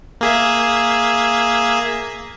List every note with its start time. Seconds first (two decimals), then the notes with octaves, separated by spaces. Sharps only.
0.21 A#3 G#4 E5